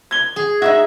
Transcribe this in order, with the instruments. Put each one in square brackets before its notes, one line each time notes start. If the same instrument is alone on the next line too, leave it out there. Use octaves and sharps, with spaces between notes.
[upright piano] G#6 G7
[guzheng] G#4
[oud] D#4 E4 F#4 [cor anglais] E5